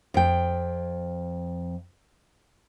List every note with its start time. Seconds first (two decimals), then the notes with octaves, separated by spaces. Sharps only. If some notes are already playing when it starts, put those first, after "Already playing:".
0.14 F2 G5